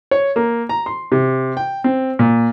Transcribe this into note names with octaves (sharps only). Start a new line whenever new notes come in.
C#5
A#3
A#5
C6
C3
G5
C4
A#2